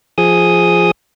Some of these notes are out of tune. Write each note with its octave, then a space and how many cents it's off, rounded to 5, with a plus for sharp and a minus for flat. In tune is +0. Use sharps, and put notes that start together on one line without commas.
F3 +0 G#4 +0 D#6 +0